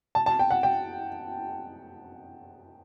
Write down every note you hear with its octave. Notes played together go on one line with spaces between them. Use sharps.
A5
A5
G5
F#5
G5